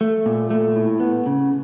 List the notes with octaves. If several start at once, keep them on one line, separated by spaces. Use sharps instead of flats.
A3
A#2
A3
A2
B3
C#3